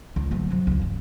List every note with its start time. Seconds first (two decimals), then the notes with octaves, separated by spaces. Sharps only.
0.16 C#2 D3
0.31 D2 F#3
0.50 C3 F#3
0.67 C#2 A#3
0.79 G2 E3